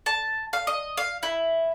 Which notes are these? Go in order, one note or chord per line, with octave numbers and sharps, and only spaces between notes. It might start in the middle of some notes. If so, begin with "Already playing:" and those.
A5
F5
D#5
F5
E4